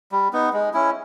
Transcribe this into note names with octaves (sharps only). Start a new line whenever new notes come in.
G3
B3 D#4
G#3
C#4 E4